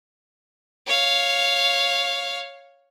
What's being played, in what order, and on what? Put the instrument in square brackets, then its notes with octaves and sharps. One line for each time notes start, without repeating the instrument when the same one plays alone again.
[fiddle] C#5 F5